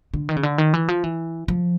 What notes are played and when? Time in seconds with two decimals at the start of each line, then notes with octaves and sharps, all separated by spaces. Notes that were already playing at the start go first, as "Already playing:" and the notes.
0.14 D3
0.29 D#3
0.36 C#3
0.43 D3
0.58 D#3
0.74 E3
0.88 F3
1.04 E3
1.48 F3